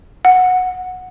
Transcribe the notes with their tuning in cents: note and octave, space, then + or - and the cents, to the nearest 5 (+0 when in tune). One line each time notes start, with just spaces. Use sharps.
F#5 -15